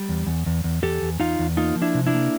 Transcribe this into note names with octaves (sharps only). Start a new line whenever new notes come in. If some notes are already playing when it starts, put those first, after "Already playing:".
Already playing: G3
E2
E2
E2
E2
E2 G4 A4
E2
E2 D#4 F4
E2
A#3 D#4 F4
F3
D4 E4
C3
D4 E4
A#3